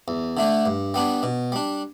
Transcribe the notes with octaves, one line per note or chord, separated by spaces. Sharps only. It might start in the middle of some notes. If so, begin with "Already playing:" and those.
E2
D3 A3 D4
G2
G3 B3 D4
B2
G3 D4